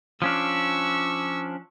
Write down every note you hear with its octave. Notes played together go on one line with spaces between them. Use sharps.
F3 C#4 D4 C#6 E6